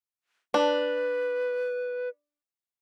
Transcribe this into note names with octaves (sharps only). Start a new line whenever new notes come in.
D4 B4